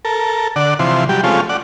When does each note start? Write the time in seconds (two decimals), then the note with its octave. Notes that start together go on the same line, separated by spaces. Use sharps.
0.05 A4 A#4
0.56 D3 D5 F#5
0.79 C3 E3 F3 C6
1.09 F#3 G3 G4
1.24 F3 G#3 A3 C4 C#4 F4
1.49 D5 F#5